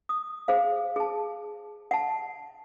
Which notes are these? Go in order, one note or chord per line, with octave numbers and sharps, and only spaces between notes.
D#6
G#4 C5 F5
G#4 A5
F#5 A5